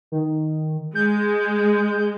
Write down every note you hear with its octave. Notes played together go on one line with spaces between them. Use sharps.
D#3
G#3 G6